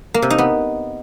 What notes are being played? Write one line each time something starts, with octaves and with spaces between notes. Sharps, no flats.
A#3
C3
D#4
B3